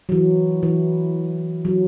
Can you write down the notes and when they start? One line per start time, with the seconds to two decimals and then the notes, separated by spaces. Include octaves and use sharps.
0.09 F#3
0.12 E3
0.63 E3
1.65 F#3